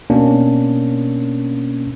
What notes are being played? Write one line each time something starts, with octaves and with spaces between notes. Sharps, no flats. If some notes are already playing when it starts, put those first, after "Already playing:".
B2 A#3 C#4 D4